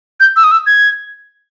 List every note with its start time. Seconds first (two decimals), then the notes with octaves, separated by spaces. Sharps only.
0.20 G6
0.36 E6
0.44 D#6
0.51 E6
0.66 G#6